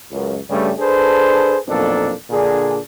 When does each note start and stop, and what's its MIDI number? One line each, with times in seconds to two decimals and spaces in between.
0.12 0.38 37
0.12 0.38 42
0.49 0.71 43
0.49 0.71 49
0.49 0.71 55
0.49 0.71 57
0.79 1.57 62
0.79 1.57 68
0.79 1.57 69
0.79 1.57 71
0.79 1.57 72
1.68 2.12 35
1.68 2.12 41
1.68 2.12 46
1.68 2.12 58
1.68 2.12 62
1.68 2.12 69
2.30 2.77 46
2.30 2.77 50
2.30 2.77 62
2.30 2.77 68